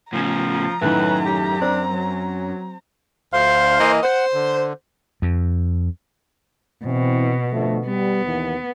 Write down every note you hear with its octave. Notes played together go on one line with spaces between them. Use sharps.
A2 C#3 F3 A#5
F#2 A2 D#3 B4
G4
C4 D4
F#3
D2 C5 F5 C6
E3 A#3 D#5
C5 F#5
D3
F2
B2 E3 C4
D3 F3 A3
G3 B3
D#2 E3